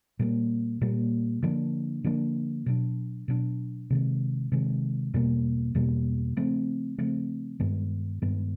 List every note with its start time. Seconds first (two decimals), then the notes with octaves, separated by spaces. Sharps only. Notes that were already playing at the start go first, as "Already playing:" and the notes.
0.19 A#2 G3 A#3
0.81 A#2 G3 A#3
1.42 D3 F3 A#3 D4
2.04 D3 F3 A#3 D4
2.66 B2 F#3 B3 D4
3.28 B2 F#3 B3 D4
3.90 C3 D#3 G#3
4.52 C3 D#3 G#3
5.14 E2 B2 G3 A#3
5.75 E2 B2 G3 A#3
6.37 C#3 F3 A3 C4
6.98 C#3 F3 A3 C4
7.60 G2 D#3 G#3 B3
8.22 G2 D#3 G#3 B3